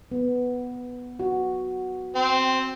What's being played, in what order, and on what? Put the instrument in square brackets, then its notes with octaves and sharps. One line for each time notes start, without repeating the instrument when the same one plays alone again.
[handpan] B3
F#4
[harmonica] C4